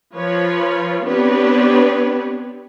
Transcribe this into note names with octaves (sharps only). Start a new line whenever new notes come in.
F3 F4 B4 C#5
B3 C4 D4 G4 B4 C#5